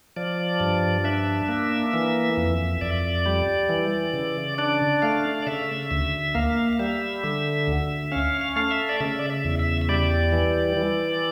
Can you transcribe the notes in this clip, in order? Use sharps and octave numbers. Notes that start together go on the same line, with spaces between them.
F3 D5
G2
D4 E5
A#3
E3
F2
F2 D5
G3
E3
C#3
D4 D5
A3 F5
D5
C#3 E5
D2
A#3 F5
F5
G3 E5
D3
D2
C#4 F5
F5
A3 F5
E5
D5
C#3 E5
D5
E5
E2
E5
E5
G3 D5
E3
E3